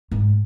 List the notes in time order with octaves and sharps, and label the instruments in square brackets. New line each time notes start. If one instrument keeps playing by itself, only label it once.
[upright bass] G#2